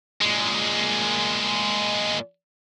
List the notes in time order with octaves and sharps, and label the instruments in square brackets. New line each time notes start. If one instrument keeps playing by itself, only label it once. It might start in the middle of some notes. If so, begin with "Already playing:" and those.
[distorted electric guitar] A#2 G#3